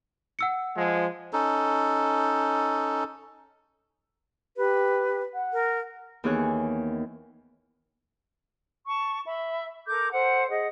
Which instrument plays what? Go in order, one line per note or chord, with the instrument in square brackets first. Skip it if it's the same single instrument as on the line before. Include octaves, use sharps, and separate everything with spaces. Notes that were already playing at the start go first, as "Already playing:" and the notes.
[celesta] F#5 E6 C#7
[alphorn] F3 [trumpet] G#3
[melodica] C#4 D#4 A4
[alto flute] G4 [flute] B4
[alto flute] F#5
[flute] A#4
[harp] D#2 E3 B3 G#4 C#5 F#6
[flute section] A5 C#6
E5 B5
A4 A#4 D6 G6
A4 C5 F#5
G#4 D#5 F#5